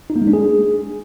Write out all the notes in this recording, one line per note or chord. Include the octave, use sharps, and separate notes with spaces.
D#4
A#3
G#3
D4
G#4